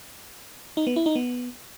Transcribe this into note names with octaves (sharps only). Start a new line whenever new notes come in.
D#4
B3
E4
D#4
B3